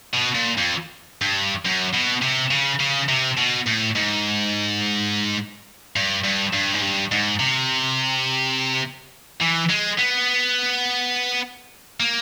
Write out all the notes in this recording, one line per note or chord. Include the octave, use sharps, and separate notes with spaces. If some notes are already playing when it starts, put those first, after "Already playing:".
B2
A#2
F2
G2
F#2
B2
C3
C#3
C#3
C3
B2
A2
G#2
G2
G2
G2
G#2
G2
G#2
C3
E3
G#3
B3
A#3